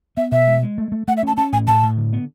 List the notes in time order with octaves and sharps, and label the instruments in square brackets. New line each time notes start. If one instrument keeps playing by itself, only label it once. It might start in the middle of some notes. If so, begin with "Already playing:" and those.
[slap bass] B3 [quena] E5
[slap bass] B2 [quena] E5
[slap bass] G#3
G#3
A3
A3
[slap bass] A3 [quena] F#5
[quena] E5
[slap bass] C#4 [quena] A5
[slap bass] C#4 [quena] A5
[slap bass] A2 [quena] G#5
[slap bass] A2 [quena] A5
[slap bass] A2
D3
B3